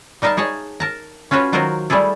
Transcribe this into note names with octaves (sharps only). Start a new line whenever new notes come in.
G3 D#4 A#4 E5 F5 A5
D#4 G#4 C#5 A5
A#4 A5 A#5
C#4 F4 F#4 B4 C#5
D#3 F#3 F4 F#4 A#4 C5
G3 A3 E4 G#4 A4